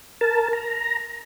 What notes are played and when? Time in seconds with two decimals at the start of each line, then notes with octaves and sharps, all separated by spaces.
0.21 A#4 A5
0.53 A#5